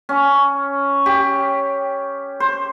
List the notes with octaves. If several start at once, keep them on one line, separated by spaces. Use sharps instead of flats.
C#4
G4
C5